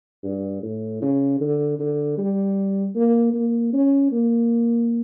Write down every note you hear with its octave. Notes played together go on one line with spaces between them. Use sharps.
G2
A2
C#3
D3
D3
G3
A#3
A#3
C#4
A#3